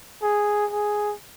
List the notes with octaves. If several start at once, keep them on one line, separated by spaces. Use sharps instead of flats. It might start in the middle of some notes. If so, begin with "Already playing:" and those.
G#4
G#4